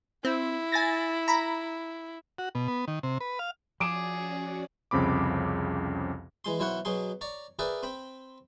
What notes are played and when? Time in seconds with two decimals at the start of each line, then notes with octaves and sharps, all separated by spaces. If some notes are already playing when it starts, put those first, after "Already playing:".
0.25 C4 E4
0.72 G#5 A6 A#6
1.28 A#5 B5
2.38 F#4
2.55 B2
2.68 B3
2.88 D#3
3.03 C3
3.20 B4
3.39 F5
3.80 F3 C#4 F#4 G#4 D5 D6 D7 E7
4.91 C2 F2 C#3 C4 B5 D6
6.45 E3 G#3 C6
6.60 B1 E3 E4 C5 C#5 F#5
6.85 B2 F#3 G#4 C6
7.21 C#5 D5 A#5
7.59 G#4 A#4 B4 D5 E5 G5
7.83 C4 G5 B5